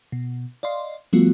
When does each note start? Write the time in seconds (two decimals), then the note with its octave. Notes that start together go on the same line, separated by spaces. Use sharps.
0.12 B2
0.63 D5 D#5 F5 C6
1.13 F3 G3 A3 B3 F4 F#4